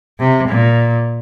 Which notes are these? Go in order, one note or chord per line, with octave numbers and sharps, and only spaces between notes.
C3
A#2